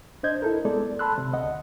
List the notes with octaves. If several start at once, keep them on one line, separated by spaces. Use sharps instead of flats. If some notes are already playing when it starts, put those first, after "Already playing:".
D4 C5 D#5 G6 G#6
E4 A4 A#4
G#3 B3 A4 D5
A5 B5 C6 E6 F#6
C3
D2 D#5 F#5